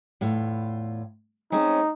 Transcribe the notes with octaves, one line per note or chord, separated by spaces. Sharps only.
E2 A2 F4
G#3 C4 C#4 D#4